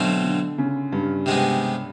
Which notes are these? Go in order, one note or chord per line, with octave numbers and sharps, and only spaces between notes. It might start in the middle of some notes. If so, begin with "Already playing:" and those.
Already playing: B2 D3 F#3 A3 C4 F4
D3
C#3
G2
C3 D#3 G#3 B3